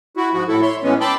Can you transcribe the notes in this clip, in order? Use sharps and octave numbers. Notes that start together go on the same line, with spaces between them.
E4 F#4
G#2 F3 F#4
A2 E4 A4
C#5 E5 C6
A2 E3 G#3 B3 C#4
G5 A5 B5 C6 D6 E6